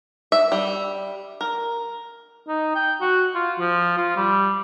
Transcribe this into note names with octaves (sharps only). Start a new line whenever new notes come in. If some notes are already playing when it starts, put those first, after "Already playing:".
E5
G3
A#4
D#4
G5
F#4
F4
F3
F4
G3